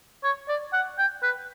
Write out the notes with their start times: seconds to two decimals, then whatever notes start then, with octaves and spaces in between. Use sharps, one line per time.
0.24 C#5
0.49 D5
0.73 F#5
0.99 G5
1.23 B4